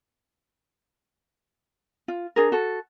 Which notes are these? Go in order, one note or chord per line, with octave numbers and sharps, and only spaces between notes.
F4
D4 G#4 A#4
F#4 A4